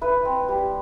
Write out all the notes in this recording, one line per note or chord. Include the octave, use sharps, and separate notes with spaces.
E4 B4
C4
G3